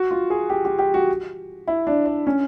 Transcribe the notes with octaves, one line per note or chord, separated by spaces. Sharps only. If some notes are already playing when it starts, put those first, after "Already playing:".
Already playing: F#4
F4
G#4
G4
G4
G4
F#4
E4
D4
D4
C#4